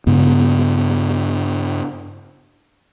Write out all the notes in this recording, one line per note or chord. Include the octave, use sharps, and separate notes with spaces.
G2 C#3 B3